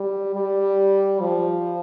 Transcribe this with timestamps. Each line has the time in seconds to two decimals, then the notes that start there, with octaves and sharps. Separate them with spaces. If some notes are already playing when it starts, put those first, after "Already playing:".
Already playing: G3
0.35 G3
1.20 F3